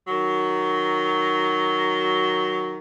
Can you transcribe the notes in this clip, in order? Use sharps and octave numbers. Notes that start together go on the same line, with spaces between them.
D#3 F#3